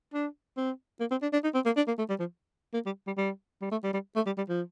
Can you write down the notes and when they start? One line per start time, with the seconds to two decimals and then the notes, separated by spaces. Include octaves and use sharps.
0.14 D4
0.57 C4
1.00 A#3
1.11 C4
1.22 D4
1.33 D4
1.44 D#4
1.54 C4
1.66 A#3
1.77 D4
1.87 A#3
1.98 A3
2.09 G3
2.20 F3
2.74 A#3
2.86 G3
3.07 G3
3.17 G3
3.62 G3
3.71 A3
3.83 G3
3.93 G3
4.16 A3
4.26 G3
4.38 G3
4.48 F3